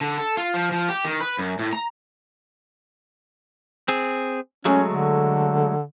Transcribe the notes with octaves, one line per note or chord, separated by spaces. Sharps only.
D3
A4
F4
F3
F3
G4
D#3
B4
F#2
A2
A#5
C4 G#4
F#3 G#3 A3 C#4
D3